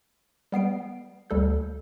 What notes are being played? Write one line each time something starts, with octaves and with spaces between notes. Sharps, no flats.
G3 B3 C7 D7
D2 G3 A4 G6